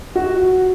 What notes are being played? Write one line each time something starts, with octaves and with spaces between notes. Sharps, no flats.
F#4